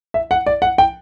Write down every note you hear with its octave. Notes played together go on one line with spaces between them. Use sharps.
E5
F#5
D5
F#5
G5